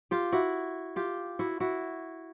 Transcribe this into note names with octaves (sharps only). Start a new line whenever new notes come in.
F4 G4
E4 F#4
F4 G4
E4 F#4
E4 F#4